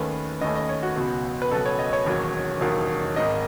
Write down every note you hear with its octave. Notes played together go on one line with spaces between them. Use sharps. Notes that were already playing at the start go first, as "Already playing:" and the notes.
Already playing: D#2 D#3 A3 C#4 B4
D#2 D#3 A3 C#4 D#5
D#5
C#5
F#4
C#2 B2 F#3 B3
B4
C#2 B2 F#3 B3 A4
C#5
D#5
C#5
E1 D#2 D#3 F#3
E1 D#2 D#3 F#3
G#1 G#2 D#3 D#5